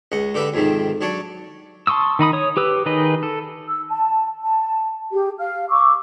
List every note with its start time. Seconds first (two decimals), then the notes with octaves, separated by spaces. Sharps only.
0.12 C#2 D#5 F#5
0.34 D3 G4 B4 E5 B5
0.54 F2 G#2 C3 D#3
1.01 F#3 D4 C#5 D5
1.87 A5 C6 C#6 D#6 E6
2.19 D#3 D#4 B5 D#6
2.33 C#5 D#6
2.57 G4 B4 E6
2.86 D#3 D#4 G#4 B4 D#5
3.23 A4
3.67 E6
3.90 A5
4.43 A5
5.11 G4 G#4
5.38 F5 F6
5.69 C#6 D6 E6